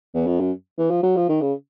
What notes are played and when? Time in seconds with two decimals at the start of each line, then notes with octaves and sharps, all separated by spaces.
0.14 E2
0.26 F2
0.40 F#2
0.78 E3
0.90 F3
1.03 F#3
1.16 F3
1.29 D#3
1.41 C#3